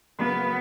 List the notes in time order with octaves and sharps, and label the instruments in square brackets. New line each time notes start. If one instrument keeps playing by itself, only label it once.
[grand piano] F#2 C#3 F#3 A#3 [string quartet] B3